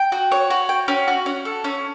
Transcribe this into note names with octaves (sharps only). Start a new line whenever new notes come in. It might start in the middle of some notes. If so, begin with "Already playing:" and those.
Already playing: G5
F#4
C#5
F#4
G5
C#4
F#4
C#4
A4
C#4